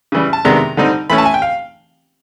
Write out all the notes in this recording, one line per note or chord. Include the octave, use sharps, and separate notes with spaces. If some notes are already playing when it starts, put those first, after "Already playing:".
C#3 E3 G3
A5
C3 D#3 G#3 B3 D4 A#5
D3 G3 C4 D#4
E3 A3 C#4 B5
A5
G#5
G5
F5